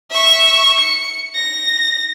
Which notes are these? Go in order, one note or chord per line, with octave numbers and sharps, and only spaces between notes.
E5 C#6
C#7
A#6